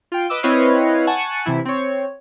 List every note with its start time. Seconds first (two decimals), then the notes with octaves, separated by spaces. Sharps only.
0.12 F4 G5
0.30 B4 D#5 D6 E6
0.43 C4 E4 B4 C#5 D#5 F5
1.07 F#5 G#5 A5 C#6
1.46 C3 E3 E4
1.65 C4 C#5